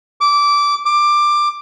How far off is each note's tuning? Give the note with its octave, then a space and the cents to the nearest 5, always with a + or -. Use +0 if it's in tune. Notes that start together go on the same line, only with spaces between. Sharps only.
D6 -15
D6 +15